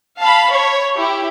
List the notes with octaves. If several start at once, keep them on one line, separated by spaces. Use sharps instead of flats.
F5 A5 B5
C#5
E4 G4